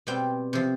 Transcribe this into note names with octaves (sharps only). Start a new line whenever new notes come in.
B2 G3 C4 G5
C3 F3